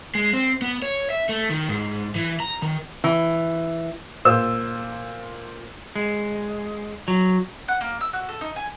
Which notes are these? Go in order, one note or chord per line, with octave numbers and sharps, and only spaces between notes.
G#3
C4
B3
C#5
E5
A3
D#3
G#2
E3
A#5
D#3
E3
A#2 C5 E6
G#3
F#3
F#5
A#3
E6
F#4
A4
D#4
G#5